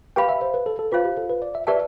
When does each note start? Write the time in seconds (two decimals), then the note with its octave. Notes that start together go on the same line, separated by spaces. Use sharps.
0.16 G4 B4 F5 G5 B5
0.29 E5
0.42 C5
0.54 B4
0.66 A4
0.79 A4
0.92 F4 B4 C5 F5
1.04 G4
1.17 A4
1.30 B4
1.42 D5
1.55 E5
1.67 G4 B4 D5 E5 A5